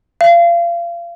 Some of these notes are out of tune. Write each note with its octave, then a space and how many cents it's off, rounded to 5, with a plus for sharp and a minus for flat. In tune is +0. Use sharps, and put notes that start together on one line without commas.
F5 -30